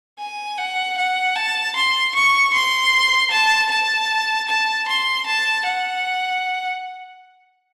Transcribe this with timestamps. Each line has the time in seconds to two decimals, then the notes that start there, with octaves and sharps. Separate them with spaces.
0.19 G#5
0.58 F#5
0.97 F#5
1.36 A5
1.75 C6
2.15 C#6
2.54 C6
3.31 A5
3.71 A5
4.48 A5
4.88 C6
5.26 A5
5.65 F#5